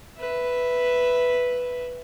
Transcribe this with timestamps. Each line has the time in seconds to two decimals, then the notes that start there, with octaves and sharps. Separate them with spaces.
0.19 B4 E5